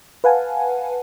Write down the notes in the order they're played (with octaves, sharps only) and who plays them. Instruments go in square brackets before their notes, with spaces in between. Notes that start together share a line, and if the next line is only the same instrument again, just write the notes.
[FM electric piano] B4 F5 F#5 G#5 A5